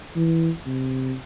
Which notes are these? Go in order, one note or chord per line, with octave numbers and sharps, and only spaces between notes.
E3
C3